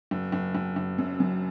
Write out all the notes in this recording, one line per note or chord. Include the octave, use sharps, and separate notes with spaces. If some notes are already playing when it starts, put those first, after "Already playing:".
F#1
F#1
F#1
F#1
F#2
F#2